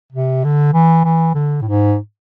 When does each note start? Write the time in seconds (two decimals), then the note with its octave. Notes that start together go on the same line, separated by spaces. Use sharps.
0.13 C3
0.44 D3
0.73 E3
1.04 E3
1.35 D3
1.61 A2
1.65 G#2